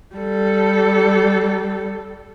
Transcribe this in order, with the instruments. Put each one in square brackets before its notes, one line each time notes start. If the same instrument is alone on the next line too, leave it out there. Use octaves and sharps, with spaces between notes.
[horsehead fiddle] G3 A4